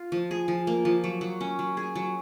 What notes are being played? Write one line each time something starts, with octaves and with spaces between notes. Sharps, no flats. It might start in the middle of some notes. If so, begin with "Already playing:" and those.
Already playing: F4
F3
G#4
F3
A#3
F3
F#3
F#3
C#4
F#3
G#4
F#3